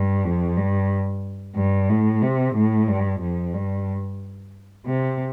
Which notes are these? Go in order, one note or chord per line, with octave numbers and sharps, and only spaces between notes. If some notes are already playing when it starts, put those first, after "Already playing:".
Already playing: G2
F2
G2
G2
A2
C3
A2
G2
F2
G2
C3